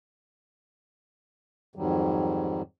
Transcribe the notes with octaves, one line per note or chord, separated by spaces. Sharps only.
F2 G#2 D#3 F#3 G3